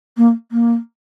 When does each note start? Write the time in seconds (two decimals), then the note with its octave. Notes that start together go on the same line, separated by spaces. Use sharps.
0.17 A#3
0.51 A#3